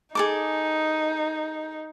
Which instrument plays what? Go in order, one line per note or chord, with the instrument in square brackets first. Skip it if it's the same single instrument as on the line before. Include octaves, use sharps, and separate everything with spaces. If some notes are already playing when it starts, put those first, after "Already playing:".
[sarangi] D#4 [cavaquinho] G#4 A4 D6